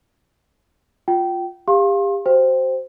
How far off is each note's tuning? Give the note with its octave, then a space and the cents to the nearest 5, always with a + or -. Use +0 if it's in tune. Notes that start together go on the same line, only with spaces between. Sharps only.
F4 +10 G5 -25
G4 +30 F5 +0 C6 +40
F#4 +25 C5 +0 G5 +0